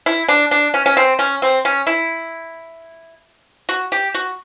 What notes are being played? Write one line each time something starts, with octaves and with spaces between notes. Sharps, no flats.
E4
D4
D4
C#4
C#4
C4
C#4
C4
C#4
E4
F#4
G4
F#4